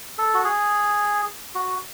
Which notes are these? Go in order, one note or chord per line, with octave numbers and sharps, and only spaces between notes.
A4
F#4
G#4
F#4